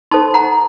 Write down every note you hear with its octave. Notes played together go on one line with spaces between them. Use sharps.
D#4 A4 C5 A5 C6
F#5 A#5